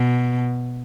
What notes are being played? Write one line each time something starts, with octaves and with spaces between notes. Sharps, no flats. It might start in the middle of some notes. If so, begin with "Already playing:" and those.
Already playing: B2